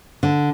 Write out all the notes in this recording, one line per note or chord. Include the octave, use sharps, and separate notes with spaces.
D3